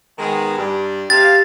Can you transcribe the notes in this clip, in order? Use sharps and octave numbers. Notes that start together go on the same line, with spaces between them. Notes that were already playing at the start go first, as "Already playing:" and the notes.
D#3 G#3 B3
G2 D5
C3 G4 F5 A6